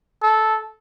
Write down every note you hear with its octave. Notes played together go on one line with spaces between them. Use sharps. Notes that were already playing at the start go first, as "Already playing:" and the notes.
A4